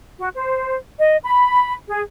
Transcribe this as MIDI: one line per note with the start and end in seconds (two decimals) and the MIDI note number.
0.18 0.28 66
0.35 0.76 72
0.98 1.16 75
1.23 1.73 83
1.88 2.01 68